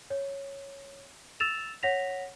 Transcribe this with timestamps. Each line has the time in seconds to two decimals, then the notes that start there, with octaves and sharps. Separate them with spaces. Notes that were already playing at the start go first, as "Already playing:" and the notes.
0.10 C#5
1.40 E6 A6 E7 F7
1.83 C#5 F#5 A#6 B6 F7